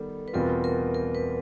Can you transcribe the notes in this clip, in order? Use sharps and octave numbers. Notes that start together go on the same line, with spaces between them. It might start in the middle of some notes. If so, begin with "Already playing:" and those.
Already playing: D#3 G3 B3 A4
B4
E2 B2 G3 C4 F4 A#4
A#4
A#4
B4